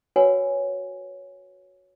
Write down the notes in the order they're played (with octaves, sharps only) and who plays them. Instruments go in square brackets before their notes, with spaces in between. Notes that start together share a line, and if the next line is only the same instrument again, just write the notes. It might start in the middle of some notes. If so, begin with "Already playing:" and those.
[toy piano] F#4 A#4 B4 C#5 F#5 G#5